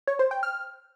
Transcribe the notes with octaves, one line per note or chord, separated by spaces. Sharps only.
C#5
C5
G5
F6